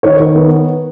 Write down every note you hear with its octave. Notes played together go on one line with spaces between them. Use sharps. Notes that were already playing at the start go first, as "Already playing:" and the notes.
D#3 C#5
D#3
B3